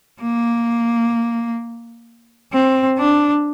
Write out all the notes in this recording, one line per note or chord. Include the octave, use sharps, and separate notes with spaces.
A#3
C4
D4